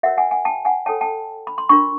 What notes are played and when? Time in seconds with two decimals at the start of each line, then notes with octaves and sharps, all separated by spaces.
0.03 F#4 A#4 C#5 E5 F#5
0.17 F#5 G#5
0.31 F#5 G#5
0.45 G5 A5
0.65 F#5 G#5
0.86 F4 A4 C#5 G5 A5
1.01 G5 A5
1.47 B5
1.58 C6
1.69 D4 F4 A#4 B5 C#6